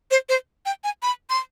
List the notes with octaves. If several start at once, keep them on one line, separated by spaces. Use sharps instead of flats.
C5
C5
G5
G#5
B5
C6